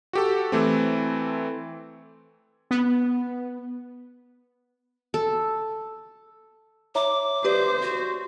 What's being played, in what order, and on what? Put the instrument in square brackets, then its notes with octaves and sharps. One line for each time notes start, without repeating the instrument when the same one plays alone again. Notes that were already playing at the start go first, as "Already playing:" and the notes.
[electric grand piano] F#4 G4 A4
E3 A3 C4
[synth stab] B3
[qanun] A4
[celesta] C#5 E5 A#5 [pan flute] D6
[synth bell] G4 B4 D5 [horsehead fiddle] C5
[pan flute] F#4